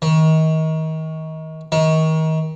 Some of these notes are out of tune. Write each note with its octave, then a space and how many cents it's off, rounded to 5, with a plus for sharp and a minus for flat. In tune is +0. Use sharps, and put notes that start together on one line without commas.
D#3 +30
D#3 +30